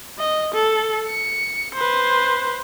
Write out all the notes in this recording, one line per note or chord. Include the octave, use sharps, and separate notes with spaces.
D#5
A4
C#7
B4 C5